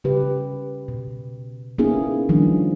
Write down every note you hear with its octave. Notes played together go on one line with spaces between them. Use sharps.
C#3 G4 B4
B2
A#3 B3 C#4 D#4 E4 G#4
D#3 F3 G3 A#3 D4